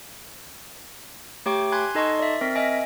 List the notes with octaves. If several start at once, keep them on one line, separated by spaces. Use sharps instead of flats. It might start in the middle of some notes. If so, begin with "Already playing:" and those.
A3 G4 C#5 G5 C#6 D6
G#5 B5 C6 F#6 G#6
D#4 A4 D#5 A5 C6 C#6
D5 E5
C4 A#4 B6
D#5 E5 G#5 A#6 D7